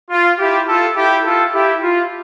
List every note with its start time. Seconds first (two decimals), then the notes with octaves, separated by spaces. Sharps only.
0.10 F4
0.38 E4 G4
0.67 F4 A4
0.95 E4 G4
1.24 F4 A4
1.53 E4 G4
1.81 F4